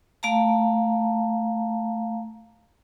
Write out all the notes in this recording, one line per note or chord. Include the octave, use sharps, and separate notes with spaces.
A3 F5 A5 A#5